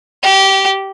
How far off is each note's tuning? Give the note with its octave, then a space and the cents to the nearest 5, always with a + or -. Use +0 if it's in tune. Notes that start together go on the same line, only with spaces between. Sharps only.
G4 -20